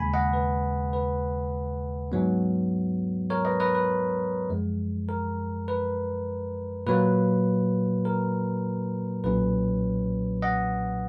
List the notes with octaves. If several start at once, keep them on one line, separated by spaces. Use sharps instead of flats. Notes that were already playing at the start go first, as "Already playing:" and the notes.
Already playing: D#2 C#3 G#3 G#5 B5
D#5 F#5
B4
B4
G#2 F#3 B3
A#4 C#5
B4 D#5
B4 D#5
B4
F#2 F3 G#3
A#4
B4
A#2 F#3 A#3 B4
A#4
B1 A#2 F#3 C#4 B4
D#5 F#5